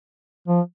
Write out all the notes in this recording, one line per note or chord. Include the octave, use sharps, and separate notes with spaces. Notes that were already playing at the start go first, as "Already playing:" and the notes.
F3